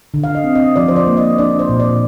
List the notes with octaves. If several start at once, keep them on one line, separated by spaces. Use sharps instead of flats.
D3
F5
D#5
C4
D#5
F3 D5
C5
D5
A#3
D#5
D4 D5
C5
A#2
D5